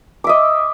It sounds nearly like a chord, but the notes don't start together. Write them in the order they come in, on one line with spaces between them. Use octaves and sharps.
D6 E5 D#5